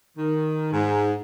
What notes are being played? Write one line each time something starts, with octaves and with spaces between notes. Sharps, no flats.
D#3
G#2